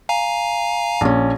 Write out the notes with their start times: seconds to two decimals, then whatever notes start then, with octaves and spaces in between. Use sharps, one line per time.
0.09 F5 G#5 A#5
1.01 A#1 C#4